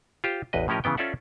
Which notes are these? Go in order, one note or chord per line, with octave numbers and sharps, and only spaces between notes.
F4 G4 C5
A1 E2 B4 D#5
A2 F3 C#4 G4 A#4 D#5
C#3 E3 B3 G5
C#4 F4 A4 D5 E5 F#5